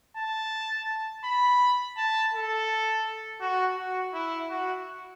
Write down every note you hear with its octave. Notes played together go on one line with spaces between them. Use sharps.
A5
B5
A5
A4
F#4
F#4
E4
F#4